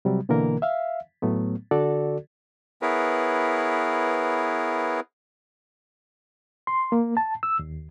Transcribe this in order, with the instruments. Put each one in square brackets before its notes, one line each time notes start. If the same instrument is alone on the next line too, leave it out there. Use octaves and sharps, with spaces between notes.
[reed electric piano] C3 F#3 G3
B2 D3 E3 A#3 A#4
E5 F5
A2 F#3 A3 B3
D3 F#4 A4 D5
[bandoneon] B3 E4 G#4 A#4 B4 C#5
[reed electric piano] C6
A#3
A5
E6
D#2